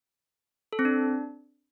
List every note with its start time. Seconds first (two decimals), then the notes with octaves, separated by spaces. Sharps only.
0.73 A4
0.79 C4
0.85 D4